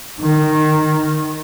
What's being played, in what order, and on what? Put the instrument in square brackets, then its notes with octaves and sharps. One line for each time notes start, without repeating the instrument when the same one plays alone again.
[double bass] D#3